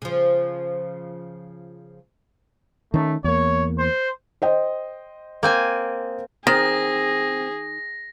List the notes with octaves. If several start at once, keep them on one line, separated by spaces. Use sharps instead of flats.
C#3 F3
D#3 A3 C#4
E2 A#3 C#5
C5
C5 D#5 G5
A#3 C4 G#5
D#3 C4 G#4 A#6